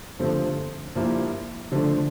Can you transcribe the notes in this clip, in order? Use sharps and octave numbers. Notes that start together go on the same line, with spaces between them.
G2 D3 F3 A3 C4
G2 F3 A#3 E4 G4
D3 F3 A3 D4